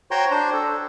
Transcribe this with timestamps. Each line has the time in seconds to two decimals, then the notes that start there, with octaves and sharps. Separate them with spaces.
0.11 F#4 C5 C#5 G5 A#5 C6
0.31 D4 C5
0.53 A4